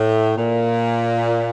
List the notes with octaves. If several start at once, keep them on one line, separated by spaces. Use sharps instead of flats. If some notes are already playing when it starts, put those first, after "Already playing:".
Already playing: A2
A#2